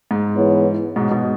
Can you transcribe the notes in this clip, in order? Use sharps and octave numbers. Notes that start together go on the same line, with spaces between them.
G#2
E3 B3 E4 G#4 C#5
G#2 B2
G#2 B2